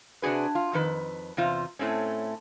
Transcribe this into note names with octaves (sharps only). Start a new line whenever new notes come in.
C3 D4 F#4 G#4 B4
F4
F2 D#3 B4
E2 C3 F4 C5
A2 A3 C4 C#4